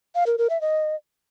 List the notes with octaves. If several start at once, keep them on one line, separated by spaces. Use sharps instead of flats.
F5
A#4
A#4
E5
D#5